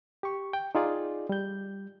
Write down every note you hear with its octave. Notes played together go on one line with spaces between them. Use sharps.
G4 C#6
G5
D#4 F4 G#4 D5
G3 G6